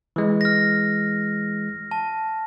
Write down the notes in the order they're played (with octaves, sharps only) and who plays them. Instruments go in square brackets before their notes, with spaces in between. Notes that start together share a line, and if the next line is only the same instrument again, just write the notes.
[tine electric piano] E3 G#3
[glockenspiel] F6 A#6
A5